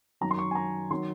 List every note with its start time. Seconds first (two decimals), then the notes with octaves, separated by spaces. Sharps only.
0.21 F#2 D#3 F#3 A#5
0.31 C6
0.38 C#6
0.51 G#5
0.55 A#5
0.91 D#3 F#3 C6